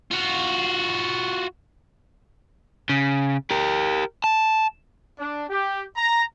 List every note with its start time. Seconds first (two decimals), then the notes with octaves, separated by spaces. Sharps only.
0.11 F4 F#4
2.90 C#3
3.51 G4 A#4
4.24 A5
5.19 D4
5.49 G4
5.96 A#5